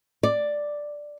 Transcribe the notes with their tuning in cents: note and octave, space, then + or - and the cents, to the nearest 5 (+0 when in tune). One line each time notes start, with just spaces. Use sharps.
D5 +5